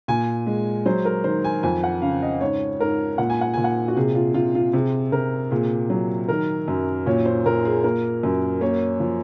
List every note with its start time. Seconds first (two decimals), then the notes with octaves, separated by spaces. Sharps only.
0.08 A#2 G#5
0.47 G#3
0.86 F#3 C5
1.05 A#4
1.24 D#3 C5
1.44 G#5
1.63 F2 G#5
1.84 F#5
2.02 C#3 F5
2.22 D#5
2.41 G#2 C#5
2.80 G#2 A#4
3.18 A#2 F#5
3.30 G#5
3.41 F#5
3.54 A#2 G#5
3.64 F#5
3.88 F#4
3.97 C3 G#4
4.15 F4
4.34 C3 F4
4.55 F4
4.73 C3 G#4
5.12 C3 A#4
5.51 A#2 G#4
5.90 F#3
6.28 D#3 A#4
6.68 F#2
7.06 A#2 C#5
7.26 C5
7.45 A#2 A#4
7.65 G#4
7.84 A#3 A#4
8.23 F#2
8.61 A#3 C#5
9.00 F3